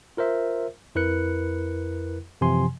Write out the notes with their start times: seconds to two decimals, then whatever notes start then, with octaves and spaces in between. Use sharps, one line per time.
0.17 F4 A#4 C5 E5
0.95 F2 E4 A#4 B4 F#6 C#7
2.41 F#2 C3 E3 F3 G#5 C6